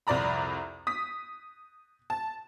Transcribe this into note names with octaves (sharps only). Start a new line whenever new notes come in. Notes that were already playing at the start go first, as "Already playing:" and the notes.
C2 F2 D5 A#5 B5
D#6 B6
A5